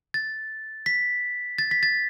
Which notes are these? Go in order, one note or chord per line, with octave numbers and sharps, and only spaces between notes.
A6
B6
A6
B6
A6